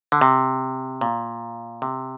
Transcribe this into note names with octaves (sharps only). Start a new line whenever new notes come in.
D3
C3
A#2
C3